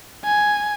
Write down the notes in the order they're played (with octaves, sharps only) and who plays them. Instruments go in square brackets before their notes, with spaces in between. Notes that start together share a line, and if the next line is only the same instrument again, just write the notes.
[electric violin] G#5